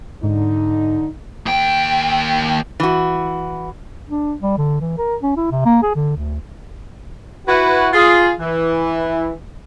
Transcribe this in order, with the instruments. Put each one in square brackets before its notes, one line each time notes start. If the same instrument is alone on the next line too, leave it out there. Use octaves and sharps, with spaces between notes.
[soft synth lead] G#2 [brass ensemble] D3 D#4
[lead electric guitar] D#2 G5
[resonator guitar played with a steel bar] E3 F#4
[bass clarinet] D4
G3
D3
E3
A#4
C#4
E4
C3
A#3
G#4
D3
D2
[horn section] E4 F#4 B4
F4 G#4
E3